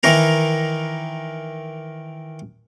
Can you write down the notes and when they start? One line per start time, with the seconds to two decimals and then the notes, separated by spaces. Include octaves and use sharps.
0.03 D#3 E3 A#4 A#5